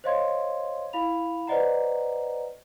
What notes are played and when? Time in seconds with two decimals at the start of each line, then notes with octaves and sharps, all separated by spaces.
0.04 C5 C#5 D#5 F5 C6 G#6
0.93 E4 F5 B5 F7
1.47 B4 C5 D5 D#5 F#5 A#5